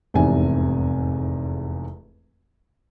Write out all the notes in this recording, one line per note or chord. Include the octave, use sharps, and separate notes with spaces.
F1 E2 G#2 C3 G#5